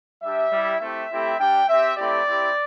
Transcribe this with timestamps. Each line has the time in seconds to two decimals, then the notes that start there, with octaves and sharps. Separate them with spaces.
0.23 G3 D4 G4 E5
0.52 G3 E4 G4
0.81 A3 C4 E4 G4 E5
1.10 A3 C4 E4 G4
1.39 G3 D4 G4 G5
1.69 C4 G4 E5
1.97 A3 C4 E4 G4 D5
2.27 C4 E4 G4